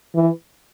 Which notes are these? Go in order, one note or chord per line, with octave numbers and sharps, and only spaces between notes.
E3